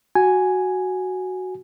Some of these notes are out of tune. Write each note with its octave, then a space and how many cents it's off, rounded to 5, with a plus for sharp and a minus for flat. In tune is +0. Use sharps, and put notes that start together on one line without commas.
F#4 +0 G#5 +0